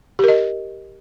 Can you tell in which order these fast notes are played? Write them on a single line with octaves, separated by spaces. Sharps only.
G4 A#4 D#5